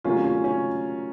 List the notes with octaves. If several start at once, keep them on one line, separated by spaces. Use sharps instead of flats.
C3 D#3 F#3 A3 C#4 F4
C#4
C#4